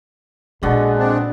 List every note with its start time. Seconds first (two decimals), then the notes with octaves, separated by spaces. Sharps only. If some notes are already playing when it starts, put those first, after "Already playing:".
0.63 A#1 B2 D3 G#3 B3
0.98 C4 D4